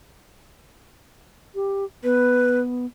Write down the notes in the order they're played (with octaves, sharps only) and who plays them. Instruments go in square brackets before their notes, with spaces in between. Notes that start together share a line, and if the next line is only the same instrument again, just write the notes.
[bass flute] G4
[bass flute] B3 [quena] B4